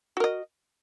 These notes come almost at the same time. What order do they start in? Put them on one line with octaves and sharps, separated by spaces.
F#4 A#4 D#5